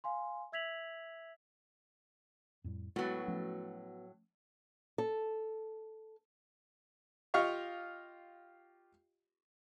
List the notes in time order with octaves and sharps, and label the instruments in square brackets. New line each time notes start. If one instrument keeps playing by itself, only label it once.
[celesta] F5 G#5 C6
E5 E6 G#6 B6 F7 F#7
[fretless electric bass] F2 A2 G3
[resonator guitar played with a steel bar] A2 F#3 [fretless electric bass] G#3 [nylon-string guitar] B3 F#4
[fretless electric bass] F3 A3 C#4
[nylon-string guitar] A4
[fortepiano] F4 G4 D#5 F5 C#6